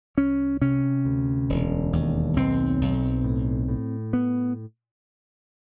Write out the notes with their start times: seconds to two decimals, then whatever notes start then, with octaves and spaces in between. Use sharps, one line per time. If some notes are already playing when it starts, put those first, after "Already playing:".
0.18 C2 C#4
0.61 C3 C#4
1.05 D2
1.49 E1
1.93 D#2
2.36 B1 C4
2.81 B1
3.24 A2
3.68 A2
4.13 B3